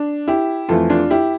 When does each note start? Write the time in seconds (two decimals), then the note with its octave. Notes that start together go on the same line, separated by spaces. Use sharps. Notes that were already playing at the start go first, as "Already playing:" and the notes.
Already playing: D4
0.28 E4 G4
0.69 F2 E3 A3 F4 A4
0.90 D4 F4
1.10 E4 G4